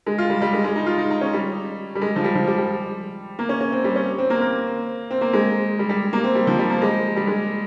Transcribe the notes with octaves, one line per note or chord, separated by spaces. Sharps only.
G#3
F4
G3
G3
G#3
G#3
D#4
F4
D#4
D#4
C#4
G3
G3
G#3
F3
G3
F3
G3
G3
A#3
C#4
C#4
C4
G3
C#4
C4
A#3
A#3
C4
A#3
G#3
G3
G3
A#3
C4
G3
F3
G3
A#3
G#3
G3
G#3